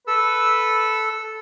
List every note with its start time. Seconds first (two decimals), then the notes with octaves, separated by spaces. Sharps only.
0.07 A4 B4 E6